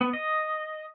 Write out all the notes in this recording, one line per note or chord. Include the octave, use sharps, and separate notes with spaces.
B3
D#5